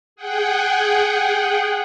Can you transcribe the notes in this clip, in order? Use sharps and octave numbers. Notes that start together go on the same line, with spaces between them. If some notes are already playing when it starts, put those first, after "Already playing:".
G#4 F#5 G5